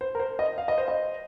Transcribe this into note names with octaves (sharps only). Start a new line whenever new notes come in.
C5
A#4
C5
D#5
F5
D#5
C5
D#5